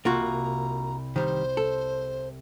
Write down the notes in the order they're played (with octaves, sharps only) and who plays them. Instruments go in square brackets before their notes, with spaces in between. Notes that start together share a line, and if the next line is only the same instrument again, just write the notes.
[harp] C2 [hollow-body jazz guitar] A#3 F4 F#4 [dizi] A#5
[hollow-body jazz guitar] D#3 G3 [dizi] C5
[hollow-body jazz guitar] A4